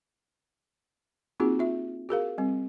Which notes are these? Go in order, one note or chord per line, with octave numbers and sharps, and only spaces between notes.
A#3 C4 D#4 F4 F#4 G#4
F4 E5
F#4 G#4 A#4 F5
G3 C4